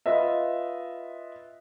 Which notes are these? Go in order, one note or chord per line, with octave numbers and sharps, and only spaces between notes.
F4 B4 D#5 E5